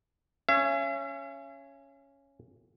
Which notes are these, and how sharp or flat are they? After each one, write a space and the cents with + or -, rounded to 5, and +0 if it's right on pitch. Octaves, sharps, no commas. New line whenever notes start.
C#4 +0 E5 +45